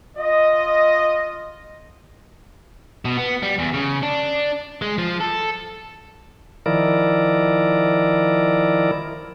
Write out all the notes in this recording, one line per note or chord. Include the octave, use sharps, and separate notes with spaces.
F4 D#5
B2
B3
G3
E2
C#3
D4
G#3
F3
A4
D#3 F3 E4 A#4 D5